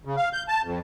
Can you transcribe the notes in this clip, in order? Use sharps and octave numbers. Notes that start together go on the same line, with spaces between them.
C#3
F5
G6
A5
F2